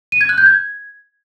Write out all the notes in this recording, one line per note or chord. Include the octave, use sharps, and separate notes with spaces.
D#7
G#6
F#6
G6
G#6